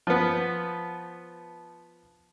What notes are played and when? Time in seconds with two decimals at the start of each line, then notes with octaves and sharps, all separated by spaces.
0.07 F3 B3